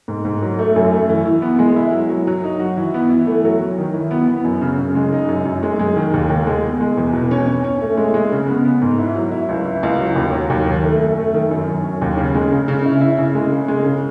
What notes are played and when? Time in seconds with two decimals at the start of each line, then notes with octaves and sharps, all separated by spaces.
0.08 G#2
0.25 G#2
0.42 F#3
0.59 A3
0.76 F#2
0.92 A3
1.09 E3
1.25 E3
1.42 B3
1.59 G#3
1.76 E4
1.92 F#3
2.09 F#3
2.27 F#3
2.44 D#4
2.60 F#4
2.77 E3
2.94 B3
3.10 E3
3.27 A3
3.45 F#3
3.61 F#3
3.78 D#3
3.94 E3
4.11 B3
4.28 B3
4.44 F#2
4.61 C#3
4.79 C#3
4.95 G#3
5.12 D#4
5.29 F#2
5.45 F#2
5.63 G#3
5.79 G#3
5.96 D#3
6.13 D#2
6.30 D#2
6.47 G#3
6.64 B3
6.81 G#3
6.98 E2
7.13 B2
7.31 C#4
7.47 C#4
7.64 C#4
7.82 A3
7.97 G#3
8.14 G#3
8.32 C#3
8.48 B3
8.65 B3
8.82 G#2
8.99 E4
9.16 F#3
9.31 E4
9.49 C#2
9.65 E4
9.83 C#2
10.00 F#3
10.16 D#2
10.33 F#3
10.50 D#2
10.67 D#3
10.83 A3
11.00 F#2
11.17 A3
11.34 D#3
11.51 F#2
11.68 F#2
11.84 C#4
12.01 D#2
12.17 C#3
12.34 G#3
12.52 C#3
12.68 C#3
12.85 E4
13.01 E4
13.18 C#3
13.35 G#3
13.52 C#3
13.68 G#3
13.85 C#3